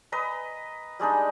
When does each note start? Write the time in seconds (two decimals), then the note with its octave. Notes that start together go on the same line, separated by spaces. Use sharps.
0.12 B4 D#5 A#5
0.99 G3 G#3 D4 D#4